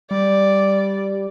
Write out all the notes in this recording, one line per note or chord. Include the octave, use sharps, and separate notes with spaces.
G3 D5